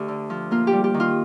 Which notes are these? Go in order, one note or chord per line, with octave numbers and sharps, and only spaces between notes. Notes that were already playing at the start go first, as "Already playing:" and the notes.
Already playing: D2 G4
D3
F3
A#3 F4
G4
G3
G4
D#3
F4